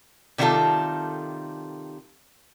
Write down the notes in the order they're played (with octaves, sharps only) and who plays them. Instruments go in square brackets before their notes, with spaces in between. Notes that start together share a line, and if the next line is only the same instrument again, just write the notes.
[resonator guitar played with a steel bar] C3 D#3 G3 D#4 F4 A4